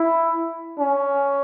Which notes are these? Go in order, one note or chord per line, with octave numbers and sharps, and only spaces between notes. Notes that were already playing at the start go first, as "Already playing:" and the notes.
Already playing: E4
C#4